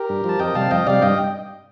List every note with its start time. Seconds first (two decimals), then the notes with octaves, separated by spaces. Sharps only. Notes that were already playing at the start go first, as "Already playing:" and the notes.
Already playing: G4 A#4
0.09 G2
0.24 F3
0.29 A5
0.39 F2 D#5 G5
0.55 C3 G3 F5 A5
0.71 F2 D#5 G5
0.87 C3 G3 D5 F5
1.02 G2 D#5 G5